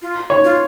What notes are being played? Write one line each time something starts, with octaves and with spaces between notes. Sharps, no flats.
F4
C#5
F4